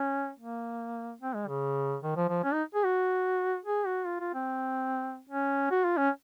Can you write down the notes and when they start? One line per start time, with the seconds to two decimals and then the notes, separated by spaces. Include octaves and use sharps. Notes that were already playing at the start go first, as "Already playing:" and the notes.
Already playing: C#4
0.39 A#3
1.21 C4
1.35 G#3
1.47 C#3
2.03 D#3
2.16 F3
2.29 F3
2.44 C#4
2.54 D#4
2.75 G#4
2.85 F#4
3.65 G#4
3.86 F#4
4.06 F4
4.20 F4
4.34 C4
5.29 C#4
5.71 F#4
5.84 F4
5.97 C#4